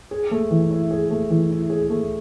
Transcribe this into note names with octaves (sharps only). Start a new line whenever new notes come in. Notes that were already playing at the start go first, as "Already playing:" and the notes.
G#4
A3
E3
E4
G#4
A3
E3
E4
G#4
A3